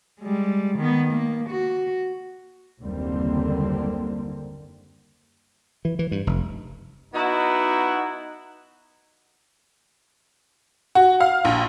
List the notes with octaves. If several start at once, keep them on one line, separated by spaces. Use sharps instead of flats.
G3 G#3
D#3 B3
A#3
F#4
F#1 D#2 D3 G3 A#3 C4
E3
E3
G2
F1
B3 D#4 E4 F#4
F#4
F5
A#1